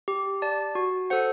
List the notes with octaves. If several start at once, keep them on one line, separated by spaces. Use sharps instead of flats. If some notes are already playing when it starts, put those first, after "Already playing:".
G4
D5 A5
F#4
A4 C5 F#5